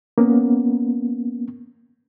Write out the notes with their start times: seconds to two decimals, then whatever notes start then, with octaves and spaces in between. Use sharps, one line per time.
0.18 A#3 B3 C#4